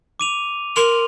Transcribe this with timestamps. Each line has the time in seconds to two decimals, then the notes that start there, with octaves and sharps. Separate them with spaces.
0.20 D6 D#7 F7
0.76 A#4 C6 F7